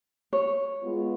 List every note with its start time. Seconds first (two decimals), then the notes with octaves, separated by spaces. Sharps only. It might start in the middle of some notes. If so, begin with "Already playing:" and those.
0.33 C#5
0.82 G#3 B3 F4